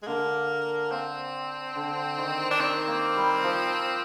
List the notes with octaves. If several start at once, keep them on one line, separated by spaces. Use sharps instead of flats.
G#3
D3 A#3
C4
D3
D#3
D4
D#3 C4
A#3
G3
F3